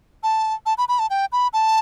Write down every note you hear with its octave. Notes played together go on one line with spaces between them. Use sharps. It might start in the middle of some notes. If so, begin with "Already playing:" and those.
A5
A5
B5
B5
A5
G5
B5
A5